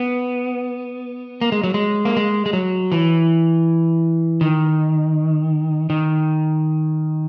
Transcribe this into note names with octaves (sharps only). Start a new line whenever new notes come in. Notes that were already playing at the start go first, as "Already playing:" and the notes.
Already playing: B3
A#3
G#3
F#3
G#3
A#3
G#3
G#3
F#3
E3
D#3
D#3